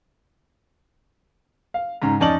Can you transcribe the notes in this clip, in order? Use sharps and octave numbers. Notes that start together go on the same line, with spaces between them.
F5
G#2 C#3 A#5
F2 C#4 D#4 D5 A5 F#7